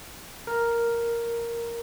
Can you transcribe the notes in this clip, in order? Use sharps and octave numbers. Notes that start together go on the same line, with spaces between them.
A#4